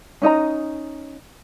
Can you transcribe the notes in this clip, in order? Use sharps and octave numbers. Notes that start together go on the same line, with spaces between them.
C#4 D#4 D#5 A#5